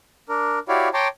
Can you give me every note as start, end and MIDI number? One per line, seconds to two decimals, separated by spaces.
0.29 0.59 62
0.29 0.59 70
0.68 0.88 64
0.68 0.88 66
0.68 0.88 67
0.68 0.88 73
0.68 0.88 74
0.68 0.88 77
0.94 1.08 73
0.94 1.08 79
0.94 1.08 81
0.94 1.08 82
0.94 1.08 84
0.94 1.08 86